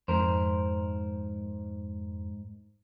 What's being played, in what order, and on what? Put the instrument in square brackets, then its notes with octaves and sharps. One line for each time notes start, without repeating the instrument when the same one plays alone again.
[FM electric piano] F2 [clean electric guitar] G#2 A#4 C5